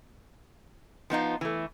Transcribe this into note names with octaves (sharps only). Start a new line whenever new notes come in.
F3 B3 D#4 F4
E3 A3